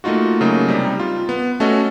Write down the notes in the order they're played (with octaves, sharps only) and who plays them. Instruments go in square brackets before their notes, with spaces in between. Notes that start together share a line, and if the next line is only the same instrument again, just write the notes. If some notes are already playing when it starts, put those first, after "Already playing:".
[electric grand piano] A3 A#3 D#4 F4 F#4
C#3 F#3 A3 A#3 D#4
C3 G3 D#4
F4
B3
A3 C#4 F#4 A4 D#5